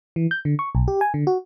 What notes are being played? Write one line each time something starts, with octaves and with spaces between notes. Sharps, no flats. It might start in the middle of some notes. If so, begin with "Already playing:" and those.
E3
G6
D3
C#6
B1
G4
G#5
D3
F#4